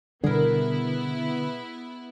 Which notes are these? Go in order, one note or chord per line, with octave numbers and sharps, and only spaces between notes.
B2 D3 G3 B3 E4 G#4 A#4